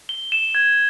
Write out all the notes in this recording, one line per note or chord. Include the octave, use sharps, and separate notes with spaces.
G7
E7
G#6